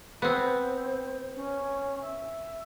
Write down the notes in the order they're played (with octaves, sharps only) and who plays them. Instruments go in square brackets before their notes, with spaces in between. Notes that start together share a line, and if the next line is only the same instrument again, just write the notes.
[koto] B3 C4 [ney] C5
[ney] C#4
E5